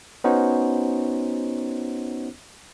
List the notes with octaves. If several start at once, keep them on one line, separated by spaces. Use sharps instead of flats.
B3 C#4 D#4 F#4 C5